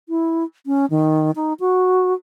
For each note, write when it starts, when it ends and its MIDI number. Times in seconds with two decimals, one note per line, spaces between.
0.09 0.44 64
0.66 0.86 61
0.90 1.31 51
1.36 1.53 63
1.60 2.13 66